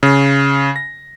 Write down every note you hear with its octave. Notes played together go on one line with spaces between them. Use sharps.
C#3
A#6